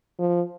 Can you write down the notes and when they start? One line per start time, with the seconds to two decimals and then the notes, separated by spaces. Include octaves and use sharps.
0.19 F3